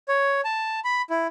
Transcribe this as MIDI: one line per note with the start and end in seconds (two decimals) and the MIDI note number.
0.08 0.41 73
0.45 0.80 81
0.84 1.02 83
1.10 1.27 64